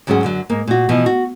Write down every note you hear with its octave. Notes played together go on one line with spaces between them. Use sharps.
D2 G#2 F#3 C#4 G#4 F#5
F#2 D3 F#3
G#2 A#3
A#2 F#4
B2 E3 F3
F#4